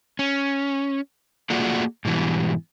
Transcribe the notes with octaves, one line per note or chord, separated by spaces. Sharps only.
C#4
A3 A#3 F4 F#4 G#4 D5
G#2 B2 E3 G3